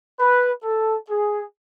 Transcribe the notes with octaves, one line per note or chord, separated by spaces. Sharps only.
B4
A4
G#4